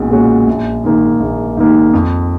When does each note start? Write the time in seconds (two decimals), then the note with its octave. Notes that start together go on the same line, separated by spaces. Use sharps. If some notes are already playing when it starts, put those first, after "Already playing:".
Already playing: B1 A#2 G#3 C#4 F#4
0.11 A#2 G#3 C#4 F#4
0.47 A#1
0.84 G#2 D#3 A#3
1.20 A#1
1.57 G#2 D#3 A#3
1.93 F2